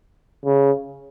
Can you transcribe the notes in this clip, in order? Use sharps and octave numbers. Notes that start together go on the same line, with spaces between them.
C#3